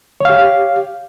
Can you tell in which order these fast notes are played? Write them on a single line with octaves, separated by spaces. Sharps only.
C#5 F5 G4